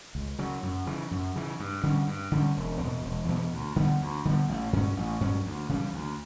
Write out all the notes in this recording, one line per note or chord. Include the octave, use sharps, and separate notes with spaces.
C#2
C#3 F#3
F#2
C#3 E3
F#2
C#3 E3
G2
D3 G3 C#4
G2
D3 G3 C#4
E1
E2 B2
E1
E2 B2
D2
D3 G3 B3
D2
D3 G3 B3
A1
G2 F#3 C#4
A1
G2 F#3 C#4
D2
C#3 E3 G3
D2